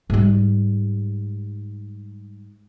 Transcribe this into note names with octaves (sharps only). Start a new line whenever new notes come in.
G#2 G3